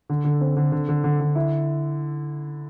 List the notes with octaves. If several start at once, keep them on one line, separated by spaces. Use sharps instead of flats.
D3
D3
C4
D3
D3
D3
D3
D3
E4